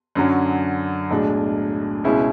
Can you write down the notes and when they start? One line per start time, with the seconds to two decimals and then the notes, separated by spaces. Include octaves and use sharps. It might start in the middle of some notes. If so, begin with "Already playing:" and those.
0.15 F#2 D3 F#3 C#4
1.10 B1 A2 G#3 D4
2.04 C#2 B2 G#3 C#4 E4